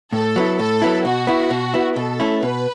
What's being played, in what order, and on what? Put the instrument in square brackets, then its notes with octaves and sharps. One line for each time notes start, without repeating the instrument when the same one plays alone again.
[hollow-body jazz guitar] A2 [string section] A4
[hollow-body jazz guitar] F#3 B3 E4
[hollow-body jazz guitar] A2 [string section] A4
[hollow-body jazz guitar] F#3 B3 E4
[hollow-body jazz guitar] B2 [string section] F#4
[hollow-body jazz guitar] B3 E4
B2
B3 E4
[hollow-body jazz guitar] B2 [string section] A4
[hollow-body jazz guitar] A3 C#4 E4
[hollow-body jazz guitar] B2 [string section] B4